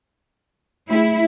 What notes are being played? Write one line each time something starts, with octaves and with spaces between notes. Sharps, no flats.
A3 E4 G#4